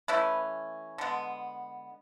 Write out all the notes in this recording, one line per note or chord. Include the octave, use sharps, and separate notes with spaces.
E3 A3 C#4 E4 B4
D3 G#3 B3